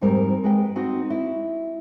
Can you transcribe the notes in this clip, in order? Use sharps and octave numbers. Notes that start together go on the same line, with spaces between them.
F2 G#2 G3 C4 A#4
G#3 B4 G5
C4 D#4 F#4
E4